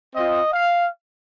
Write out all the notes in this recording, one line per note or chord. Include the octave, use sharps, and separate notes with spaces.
C4 F4 D#5
F5